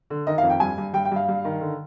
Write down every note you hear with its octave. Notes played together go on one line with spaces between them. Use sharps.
D3
D#3 D#5
F5
F2
G5
G2 G#5
G2
G2 G5
G5
G2 F5
G2
D#3
D3